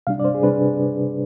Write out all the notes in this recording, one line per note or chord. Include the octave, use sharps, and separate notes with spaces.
C3 G3 D4 F5
D5
C5
G#4
C3 G3 D4 B4